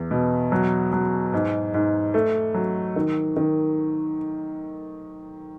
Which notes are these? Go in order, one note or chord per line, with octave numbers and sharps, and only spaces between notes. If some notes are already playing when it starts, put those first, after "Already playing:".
Already playing: E2
B2
F#3
F#3
G#2
G#2
A3
F#3
D#3
D#3